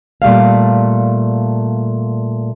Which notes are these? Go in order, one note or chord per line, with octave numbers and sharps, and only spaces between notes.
A#2 G3 A3 F5